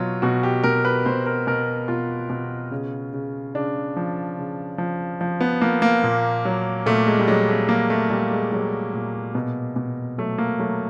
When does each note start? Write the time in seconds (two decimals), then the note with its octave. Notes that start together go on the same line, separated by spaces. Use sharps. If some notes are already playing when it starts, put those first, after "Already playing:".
Already playing: B2 F#3 F4
0.22 B2 F#4
0.43 G4
0.64 B2 A#4
0.85 B4
1.06 B2 C5
1.26 A#4
1.47 B2 A#4
1.88 B2 F4
2.30 B2
2.71 C#3
3.14 C#3
3.55 C#3 D4
3.97 F3
4.38 C#3
4.78 F3
5.21 F3
5.41 B3
5.62 F3 A#3
5.82 A#3
6.03 A#2
6.45 F#3
6.86 A#2 A3
7.07 G#3
7.19 G3
7.28 F#3 G#3
7.49 A3
7.69 F#3 A#3
7.90 A3
8.10 A#2 G3
8.31 G#3
8.52 F#3 G#3
8.94 A#2
9.35 B2
9.76 B2
10.18 F#3 A3
10.38 A#3
10.59 F#3 A3